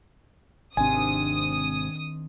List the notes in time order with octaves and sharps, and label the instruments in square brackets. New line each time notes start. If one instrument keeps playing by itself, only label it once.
[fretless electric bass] G#1 C3 [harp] D#3 C4 D4 [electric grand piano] G#5 [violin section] D#6